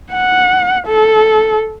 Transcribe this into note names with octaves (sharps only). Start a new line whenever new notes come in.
F#5
A4